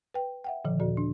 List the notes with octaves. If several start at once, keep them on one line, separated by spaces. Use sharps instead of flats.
B4 G5
E5 F#5 G5
A#2 D3 D#3 F3
D#2 A#2 F#4 D5
D4